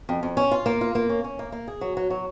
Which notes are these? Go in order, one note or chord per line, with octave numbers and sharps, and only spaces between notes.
F2
F2
C#4
F4
A#3
F4
A#3
C#4
C#4
A#3
A#3
G#4
F#3
F#3
F#3